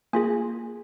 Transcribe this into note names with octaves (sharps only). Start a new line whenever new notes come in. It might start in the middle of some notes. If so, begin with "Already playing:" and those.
A#3 F4 G#4 G#5